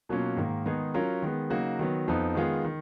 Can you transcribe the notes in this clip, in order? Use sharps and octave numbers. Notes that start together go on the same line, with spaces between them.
B2 F#3 A#3 C#4 F4
G#2 D#3 A#3
D#3 G#3 B3 D#4 G#4
F#3 C#4 F4 A#4
D#3 G#3 B3
C#3 F#3 A#3 D#4 F#4
D#3 F#3 B3
F2 F3 B3 D#4
D#3 G#3 B3 F4 G#4
D#3